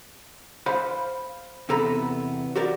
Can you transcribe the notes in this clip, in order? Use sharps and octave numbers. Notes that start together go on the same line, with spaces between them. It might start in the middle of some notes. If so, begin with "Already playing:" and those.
C5 F5 B5
E2 C3 B3 A4 A#5 B5
F#4 G4 A#4 D5